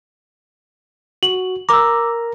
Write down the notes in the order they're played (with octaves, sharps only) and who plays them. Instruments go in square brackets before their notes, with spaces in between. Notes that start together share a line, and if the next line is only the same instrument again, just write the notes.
[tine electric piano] F#4 [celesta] F#7
[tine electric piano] A#4 A#5 [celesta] D6 E6